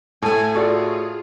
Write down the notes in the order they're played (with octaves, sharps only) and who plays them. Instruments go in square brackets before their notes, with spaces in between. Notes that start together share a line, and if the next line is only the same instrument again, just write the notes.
[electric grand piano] A2 A3 [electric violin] G#5 [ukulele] A5
[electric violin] F4 G#4 [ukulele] F#4 A4 D5